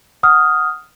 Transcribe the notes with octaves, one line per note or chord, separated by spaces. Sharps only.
F#5 D#6 F6